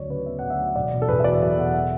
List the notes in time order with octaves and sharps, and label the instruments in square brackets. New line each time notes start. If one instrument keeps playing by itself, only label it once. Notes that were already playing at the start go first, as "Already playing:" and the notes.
Already playing: [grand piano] D2 F#3 C#5 D5
C#3 B4
B3 E5
D2 F#5
E5
F#3
E1 D5
B2
A4
E2 B4
E5
F#3 D5
E1 E5
B2 F#5
E5